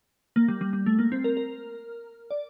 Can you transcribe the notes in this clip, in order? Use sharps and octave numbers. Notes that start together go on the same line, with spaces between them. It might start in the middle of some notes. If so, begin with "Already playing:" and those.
A#3
G3
G3
G3
A3
A#3
C4
A#4
A#4
D5